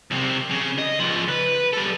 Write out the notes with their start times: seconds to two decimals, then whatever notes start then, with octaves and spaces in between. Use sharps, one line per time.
0.11 C2 C3
0.51 C#3
0.78 D#5
1.00 C#2 F3
1.28 B4
1.73 G3 A4